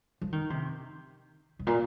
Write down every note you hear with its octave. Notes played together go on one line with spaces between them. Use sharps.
F3
D#3
C3
G#2
A#2